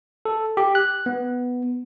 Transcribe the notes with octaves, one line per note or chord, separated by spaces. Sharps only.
A4
G4
F#6
B3